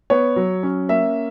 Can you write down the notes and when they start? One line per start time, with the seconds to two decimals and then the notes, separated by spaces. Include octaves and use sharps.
0.10 B3 C#5
0.36 F#3
0.63 C#4
0.89 A#3 E5